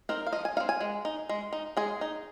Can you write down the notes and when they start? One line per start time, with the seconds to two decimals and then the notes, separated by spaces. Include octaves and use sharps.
0.09 C4 D#4 A#4
0.27 F5
0.32 F3 D#5
0.45 G#5
0.57 D#4 F5
0.60 C4
0.69 G#5
0.81 G#3
1.05 D#4
1.29 G#3
1.53 D#4
1.77 G#3 G#4
2.01 D#4